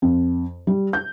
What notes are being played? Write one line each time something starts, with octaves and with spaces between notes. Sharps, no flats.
F2
G3
G6